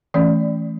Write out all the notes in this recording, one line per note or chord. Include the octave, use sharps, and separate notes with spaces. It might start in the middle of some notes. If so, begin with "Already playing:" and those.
E3 A3 C#4 D5